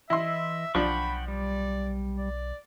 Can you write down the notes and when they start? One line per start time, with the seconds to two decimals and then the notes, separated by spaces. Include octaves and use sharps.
0.10 E3 E4 D#5 E5 C6
0.75 B1 F3 D4 F#5 G5 B5 C#6
1.28 G3 D5
2.19 D5